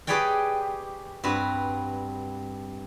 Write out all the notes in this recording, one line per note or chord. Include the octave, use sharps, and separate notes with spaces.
G4 G#4 B4 C#5 D5 G5
G2 C4 F#4 B4